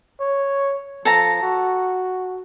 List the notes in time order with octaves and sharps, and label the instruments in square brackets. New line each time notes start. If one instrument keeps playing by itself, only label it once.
[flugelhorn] C#5
[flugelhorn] F3 [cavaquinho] A4 A5 A#5
[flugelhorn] F#4